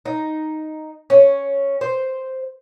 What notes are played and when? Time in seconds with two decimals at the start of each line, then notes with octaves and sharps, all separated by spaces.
0.05 D#4
1.10 C#4
1.81 C5